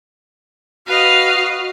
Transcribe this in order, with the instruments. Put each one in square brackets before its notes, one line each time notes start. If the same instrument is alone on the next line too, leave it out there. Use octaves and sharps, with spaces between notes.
[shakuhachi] F#4 [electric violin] B4 D#5 [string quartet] F5